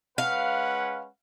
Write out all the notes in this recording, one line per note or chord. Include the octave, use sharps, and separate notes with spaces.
G#3 C#4 B4 F5 F#5